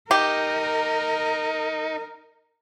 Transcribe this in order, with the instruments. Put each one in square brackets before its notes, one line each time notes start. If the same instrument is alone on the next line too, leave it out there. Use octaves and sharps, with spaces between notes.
[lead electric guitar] D#4 [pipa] G4 [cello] A#4